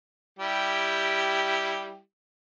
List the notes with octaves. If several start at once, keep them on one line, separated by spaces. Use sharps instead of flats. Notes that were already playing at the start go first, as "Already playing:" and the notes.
G3 E4 G4